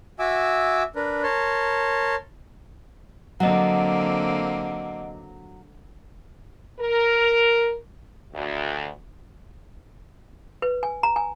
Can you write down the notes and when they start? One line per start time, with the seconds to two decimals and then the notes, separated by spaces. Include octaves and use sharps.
0.19 F#4 E5 G#5 D6 E6
0.95 D4 A#4 B4
1.23 A#4 C#5 A5 C6
3.40 D3 F#3 A#3 C4 D#5 F#5
6.79 A#4
8.34 D2
10.62 B4
10.83 G#5
11.03 A#5
11.16 G#5